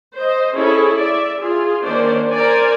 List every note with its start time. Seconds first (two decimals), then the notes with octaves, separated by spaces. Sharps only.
0.16 C5 D#5
0.55 C#4 E4 G#4 A4
0.98 D5 E5
1.39 F4 G#4
1.82 D#3 A#3 C#4 D4 C5 D5
2.31 A#4 C5 D5 G#5